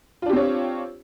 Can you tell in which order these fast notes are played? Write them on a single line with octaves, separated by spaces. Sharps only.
F4 D4 G4 C4 C#5